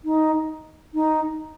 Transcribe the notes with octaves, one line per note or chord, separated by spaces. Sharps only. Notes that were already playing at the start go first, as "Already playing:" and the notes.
D#4
D#4